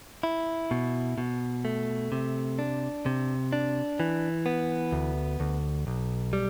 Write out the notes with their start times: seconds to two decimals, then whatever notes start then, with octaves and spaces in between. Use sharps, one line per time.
0.23 E4
0.71 B2
1.18 B2
1.65 A3
2.12 C3
2.59 D4
3.06 C3
3.53 D4
4.00 E3
4.46 B3
4.92 D2
5.40 D2
5.87 B1
6.33 G3